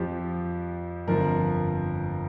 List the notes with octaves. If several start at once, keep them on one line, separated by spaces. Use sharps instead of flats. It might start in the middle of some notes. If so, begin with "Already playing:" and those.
Already playing: F2 F3 G4
G1 F2 F3 A#4